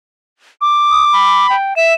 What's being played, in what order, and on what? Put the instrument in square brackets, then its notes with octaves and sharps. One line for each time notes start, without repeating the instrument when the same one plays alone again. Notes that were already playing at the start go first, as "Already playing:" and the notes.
[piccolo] D6
[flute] D#6
B5
[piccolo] G5
[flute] E5 [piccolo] E7